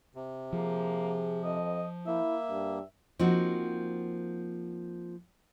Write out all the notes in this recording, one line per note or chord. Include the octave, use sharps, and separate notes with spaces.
C3
F3 A#3 G#4
F2 D#5
A#3 E4 E5
G2
F3 A#3 C4 D#4 F#4